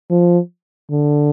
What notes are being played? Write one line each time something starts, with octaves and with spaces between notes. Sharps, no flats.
F3
D3